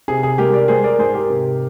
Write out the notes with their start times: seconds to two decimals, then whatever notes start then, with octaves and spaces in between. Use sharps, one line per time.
0.08 C3 G#4
0.23 G#4
0.38 G#3 G4 A#4
0.53 A#4 D5
0.68 G#3 G#4 C5
0.84 A#4 D5
0.99 G#2 G#4 C5
1.14 G4 A#4
1.30 C3